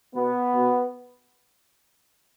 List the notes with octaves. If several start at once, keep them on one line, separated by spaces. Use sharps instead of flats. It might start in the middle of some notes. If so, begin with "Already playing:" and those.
B2 B3
B2